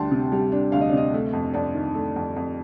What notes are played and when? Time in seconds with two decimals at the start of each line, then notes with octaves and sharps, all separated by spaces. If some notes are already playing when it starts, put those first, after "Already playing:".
Already playing: D2 G3 D4 G5 A5 C6
0.12 C3
0.32 G3
0.52 D4
0.72 D2 F5
0.81 D#5
0.90 D5
0.93 C3 D#5
1.14 A3
1.33 F2
1.54 F2 D5
1.75 D#3
1.95 A3
2.16 F2
2.36 F2